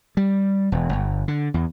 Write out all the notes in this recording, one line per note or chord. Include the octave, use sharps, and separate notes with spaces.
G3
E1
G1
D3
E2